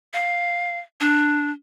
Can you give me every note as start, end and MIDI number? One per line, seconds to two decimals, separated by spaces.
0.14 0.80 77
1.01 1.51 62